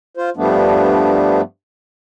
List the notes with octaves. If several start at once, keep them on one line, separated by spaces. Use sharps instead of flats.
F4 C5
G2 F3 G3 A3 B3 D4